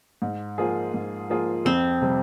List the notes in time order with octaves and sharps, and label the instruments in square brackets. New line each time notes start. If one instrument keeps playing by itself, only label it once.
[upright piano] G#2
F3 A#3 F4 G#4
G#2
F3 A#3 F4 G#4
[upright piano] F2 [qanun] C4
[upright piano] C3 G3